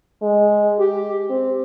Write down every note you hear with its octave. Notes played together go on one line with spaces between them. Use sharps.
G#3
G4
C4